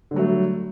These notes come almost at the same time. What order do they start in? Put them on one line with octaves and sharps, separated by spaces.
D3 G3 F#3 A3